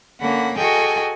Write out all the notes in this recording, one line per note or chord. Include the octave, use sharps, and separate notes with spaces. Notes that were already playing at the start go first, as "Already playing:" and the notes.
D3 A#3 C#4 F#5 B5
F#4 G#4 A4 D#5 G5 G#5